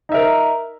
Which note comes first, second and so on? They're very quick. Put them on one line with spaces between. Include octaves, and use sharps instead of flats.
D#4 E5 A#4